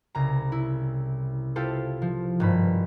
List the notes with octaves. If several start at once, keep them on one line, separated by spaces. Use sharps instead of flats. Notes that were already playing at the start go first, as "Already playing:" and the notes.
C2 C#3 A#5
E4
E4 F4 G4 A4 C5
F3
G#1 G2 B5